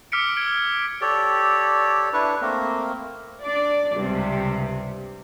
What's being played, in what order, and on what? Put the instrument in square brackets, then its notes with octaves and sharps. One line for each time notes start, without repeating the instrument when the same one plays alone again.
[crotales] D6 E6 F6 B6 C#7 D7
G#6 D7 G7
[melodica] G4 A4 C#5 D5
D4 E4 B4 C#6
A3 A#3 C4 A#4
[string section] D4 D5
C#2 G2 C3